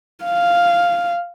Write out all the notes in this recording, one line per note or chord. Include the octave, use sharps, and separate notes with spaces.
F5